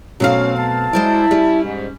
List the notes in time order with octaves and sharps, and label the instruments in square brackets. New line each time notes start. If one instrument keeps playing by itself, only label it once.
[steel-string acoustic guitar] B2 A3 C4 [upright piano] F#3 F5 [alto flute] C#4
[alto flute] A5
[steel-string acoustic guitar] G#3 C5 D5 [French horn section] E4
[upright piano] G3 [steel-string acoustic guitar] C#4
[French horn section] G#2